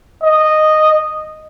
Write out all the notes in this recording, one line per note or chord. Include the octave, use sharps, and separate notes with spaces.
D#5